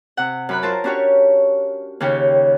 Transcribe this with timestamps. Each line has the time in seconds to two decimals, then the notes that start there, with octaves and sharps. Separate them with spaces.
0.17 C3 F#5
0.49 F#2 B5 F#6
0.62 F4 A#4 C5 A5 A#5
0.84 C#4 D4 F#4 G4 C#5
2.00 D#2 C#3 C#4 G5